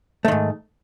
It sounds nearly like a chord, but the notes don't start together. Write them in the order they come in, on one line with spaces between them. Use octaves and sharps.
A3 D#3 G#2